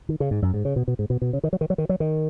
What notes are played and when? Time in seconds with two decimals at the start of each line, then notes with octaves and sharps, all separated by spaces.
0.09 D#3
0.20 C#3
0.31 G#2
0.42 F#2
0.54 G#2
0.65 C#3
0.76 B2
0.88 B2
0.99 G#2
1.10 B2
1.22 B2
1.33 C#3
1.43 D#3
1.53 F#3
1.61 D#3
1.70 F#3
1.78 D#3
1.89 F#3
2.00 D#3